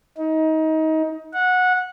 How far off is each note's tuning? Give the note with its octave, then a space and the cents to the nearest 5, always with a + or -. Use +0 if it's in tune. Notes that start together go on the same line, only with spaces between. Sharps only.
D#4 +25
F#5 -15